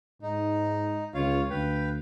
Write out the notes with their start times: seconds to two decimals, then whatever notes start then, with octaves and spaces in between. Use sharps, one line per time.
0.22 G#2 D#4
1.14 C#2 F4 C#5 F5
1.50 D2 B4 F5 G5